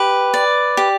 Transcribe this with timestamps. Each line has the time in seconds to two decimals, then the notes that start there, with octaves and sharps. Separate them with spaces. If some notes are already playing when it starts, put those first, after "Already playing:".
Already playing: G4 B4
0.34 D5
0.77 G4